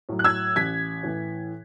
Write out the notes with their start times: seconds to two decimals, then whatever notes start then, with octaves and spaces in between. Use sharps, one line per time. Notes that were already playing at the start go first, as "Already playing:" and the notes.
0.09 A2 F#3
0.19 F#6
0.24 E6 G#6
0.56 A1 G#6 B6
1.03 A2 E3